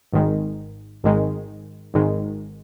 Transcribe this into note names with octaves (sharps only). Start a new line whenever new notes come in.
G#1 G#2 D#3 G#3
G#1 G#2 D#3 G#3
G#1 G#2 D#3 G#3